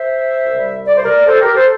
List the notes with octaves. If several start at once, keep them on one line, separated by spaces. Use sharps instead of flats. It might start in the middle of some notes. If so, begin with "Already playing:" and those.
Already playing: C5 E5
C2 C3 G3
D5
C5
A#4 D5
A4 C5
G4 A#4
A4 C5